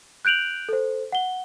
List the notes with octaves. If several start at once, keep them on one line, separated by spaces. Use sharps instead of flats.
F#6 G6 D7 F7 F#7
A4 C5
F#5 G7